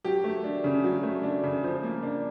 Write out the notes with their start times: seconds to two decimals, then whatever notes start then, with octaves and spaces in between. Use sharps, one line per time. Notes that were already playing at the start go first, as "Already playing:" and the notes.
0.04 F#3 G4
0.24 A3
0.44 D4
0.64 C#3
0.84 F#3
1.03 A3
1.23 D4
1.44 C#3
1.64 F3
1.83 A#3
2.03 D4